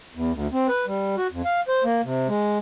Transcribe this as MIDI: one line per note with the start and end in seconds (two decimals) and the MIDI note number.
0.15 0.32 40
0.32 0.47 38
0.52 0.67 60
0.68 0.85 71
0.87 1.16 55
1.17 1.27 66
1.31 1.42 41
1.45 1.61 77
1.69 1.84 72
1.84 2.01 58
2.04 2.28 48
2.28 2.58 56